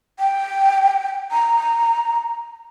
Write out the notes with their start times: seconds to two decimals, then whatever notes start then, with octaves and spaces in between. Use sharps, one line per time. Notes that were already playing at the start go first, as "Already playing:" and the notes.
0.19 G5
1.32 A#5